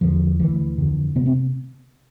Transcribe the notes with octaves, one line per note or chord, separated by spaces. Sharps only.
E2 D3 F3
D2 D3 E3
F2 D3
C3 B3
C4